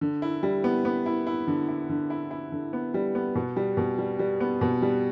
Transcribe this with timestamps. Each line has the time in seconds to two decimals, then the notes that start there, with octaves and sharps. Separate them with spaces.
0.01 D3
0.22 E4
0.43 G3
0.64 B3
0.85 B3
1.06 E4
1.27 E4
1.47 D3
1.68 E4
1.89 D3
2.10 E4
2.31 E4
2.52 D3
2.73 B3
2.94 G3
3.15 B3
3.35 B2
3.56 G3
3.77 B2
3.98 G3
4.19 G3
4.40 B3
4.61 B2
4.82 G3